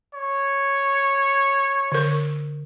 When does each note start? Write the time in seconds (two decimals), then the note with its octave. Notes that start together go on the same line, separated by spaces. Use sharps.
0.14 C#5
1.92 D3 A#4